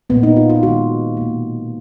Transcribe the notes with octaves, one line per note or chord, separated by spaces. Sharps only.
A#2 F3 A#3 B3
D#4
F4
F4
D#3 G#3 F#4
B2 A#3